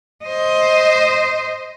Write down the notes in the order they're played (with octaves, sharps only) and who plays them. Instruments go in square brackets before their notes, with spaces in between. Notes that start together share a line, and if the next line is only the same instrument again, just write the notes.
[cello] C5 D#5